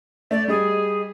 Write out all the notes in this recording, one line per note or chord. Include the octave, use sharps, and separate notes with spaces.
A3 D5
G3 G#4 D#5